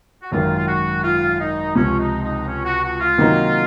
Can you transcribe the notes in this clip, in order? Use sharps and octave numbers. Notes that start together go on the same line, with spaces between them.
F#4
G#1 F#2 D#3 F4
F4
F#4
F4
D#4
C#2 C3 F3 C#4
D#4
D#4
C#4
F#4
F#4
F4
C3 D#3 F#3 A#3 D#4